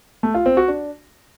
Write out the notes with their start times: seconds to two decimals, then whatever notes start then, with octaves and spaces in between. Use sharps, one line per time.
0.23 A3
0.34 F4
0.46 C4
0.57 F#4
0.68 D4